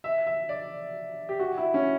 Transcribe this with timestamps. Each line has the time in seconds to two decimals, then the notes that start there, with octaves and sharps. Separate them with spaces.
0.04 E5
0.27 E5
0.49 D5
1.29 G4
1.39 F#4
1.57 E4
1.74 C#4